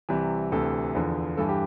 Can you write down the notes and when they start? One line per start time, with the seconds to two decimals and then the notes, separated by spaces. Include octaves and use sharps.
0.09 C2 C3 E3
0.52 D2 C3 E3 A4
0.95 E2 D3 F3
1.37 G2 E3 A4
1.49 G4